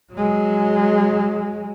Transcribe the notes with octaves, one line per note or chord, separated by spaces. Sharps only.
F#3 G#3